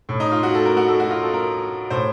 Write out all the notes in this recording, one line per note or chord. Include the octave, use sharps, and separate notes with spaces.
A2
D#4
F4
F#4
A4
A#4
F#4
A4
F#4
F4
A4
A#4
A2 C5